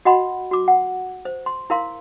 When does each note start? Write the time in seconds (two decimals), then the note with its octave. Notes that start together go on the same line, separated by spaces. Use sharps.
0.05 F#4 D#5 F#5 B5 C6
0.51 F#4 D6
0.68 F#5
1.25 C5
1.46 C6
1.70 E4 A#4 F5 C6